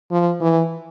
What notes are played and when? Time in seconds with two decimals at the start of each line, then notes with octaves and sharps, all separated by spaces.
0.11 F3
0.41 E3